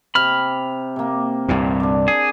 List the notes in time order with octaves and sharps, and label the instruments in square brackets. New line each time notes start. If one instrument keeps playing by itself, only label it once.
[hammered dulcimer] C3 [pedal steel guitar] B5 F6
[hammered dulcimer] C3 A#3
[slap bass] C2 G2 A#2
[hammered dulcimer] D4 D5
[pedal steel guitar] G#4